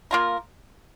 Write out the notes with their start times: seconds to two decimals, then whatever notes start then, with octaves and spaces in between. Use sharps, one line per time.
0.11 A#3 F4 A#4